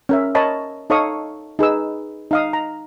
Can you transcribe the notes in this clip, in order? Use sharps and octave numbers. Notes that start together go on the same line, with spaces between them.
C#4 A#4 E5
A#4 C#5 D#5 A5 B5 D#6
D#4 A4 C#5 F5 C#6 D#6
D#4 G#4 B4 E6
D#4 F5 D#6
A#5